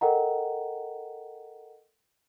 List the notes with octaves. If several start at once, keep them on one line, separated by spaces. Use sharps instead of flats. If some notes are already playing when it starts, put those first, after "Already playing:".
A4 A#4 D#5 F#5 G5 A#5